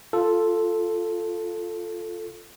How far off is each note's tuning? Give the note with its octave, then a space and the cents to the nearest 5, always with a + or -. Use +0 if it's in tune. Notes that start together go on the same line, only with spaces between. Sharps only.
F4 +0 A4 +0